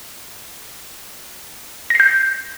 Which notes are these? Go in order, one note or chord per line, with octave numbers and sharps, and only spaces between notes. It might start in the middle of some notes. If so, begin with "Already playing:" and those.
G6 A#6 C7